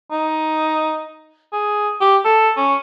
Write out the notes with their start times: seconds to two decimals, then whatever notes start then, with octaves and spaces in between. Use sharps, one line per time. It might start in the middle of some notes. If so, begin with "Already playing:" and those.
0.11 D#4
1.53 G#4
2.01 G4
2.25 A4
2.57 C#4